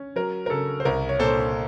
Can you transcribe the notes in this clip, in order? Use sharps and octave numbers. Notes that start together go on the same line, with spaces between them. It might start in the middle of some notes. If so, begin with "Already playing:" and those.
Already playing: C#4
F#3 A#4
A#4
C#3 A4
C5
C2 A#4
C#5
A#2 A4 C5